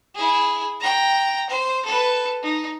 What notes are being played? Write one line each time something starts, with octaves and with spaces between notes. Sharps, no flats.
E4 G#4
G5 A#5
C5
A4 B4
D#4